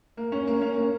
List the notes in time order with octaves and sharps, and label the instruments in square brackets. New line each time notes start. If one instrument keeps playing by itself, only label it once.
[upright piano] A#3
C#4
A#3
C#4
A#3